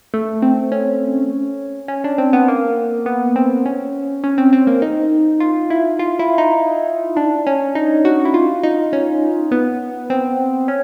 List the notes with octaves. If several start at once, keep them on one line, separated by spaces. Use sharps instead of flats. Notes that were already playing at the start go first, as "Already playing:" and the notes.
A3
C4
C#4
C#4
D4
C4
B3
A#3
B3
C4
C#4
C#4
C4
C4
A#3
D#4
F4
E4
F4
E4
D#4
D4
C#4
D#4
F#4
E4
F4
D#4
C#4
B3
C4
C#4